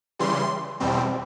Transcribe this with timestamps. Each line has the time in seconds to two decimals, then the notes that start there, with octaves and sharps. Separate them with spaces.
0.19 C#3 E3 G3 C6
0.80 E2 B2 G3 C4